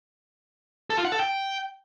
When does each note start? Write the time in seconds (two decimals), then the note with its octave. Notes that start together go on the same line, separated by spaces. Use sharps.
0.90 A4
0.97 F4
1.05 F#5
1.12 A4
1.19 G5